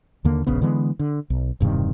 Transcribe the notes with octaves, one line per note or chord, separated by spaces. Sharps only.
D#2 D3 A#3
E1 A#1 C#3 B3
D3 E3 G#3 B3
D3
B1
E1 G2 C3 D#3